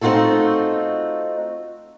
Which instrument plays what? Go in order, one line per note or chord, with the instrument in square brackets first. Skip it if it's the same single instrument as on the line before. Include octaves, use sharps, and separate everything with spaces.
[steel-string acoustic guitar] A3 C4 D#4 F4 F#4 A4